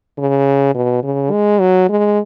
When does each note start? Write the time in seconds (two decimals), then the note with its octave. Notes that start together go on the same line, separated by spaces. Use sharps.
0.18 C#3
0.75 B2
1.03 C#3
1.31 G#3
1.60 F#3
1.89 G#3